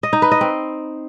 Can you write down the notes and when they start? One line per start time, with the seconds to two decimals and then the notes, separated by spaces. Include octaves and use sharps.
0.03 D#5
0.13 D#4
0.22 B4
0.31 D#5
0.41 C4